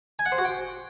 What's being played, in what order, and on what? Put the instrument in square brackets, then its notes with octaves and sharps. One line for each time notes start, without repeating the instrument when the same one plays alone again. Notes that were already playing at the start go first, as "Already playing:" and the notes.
[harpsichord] G#5
F#5
C5
F#4
G5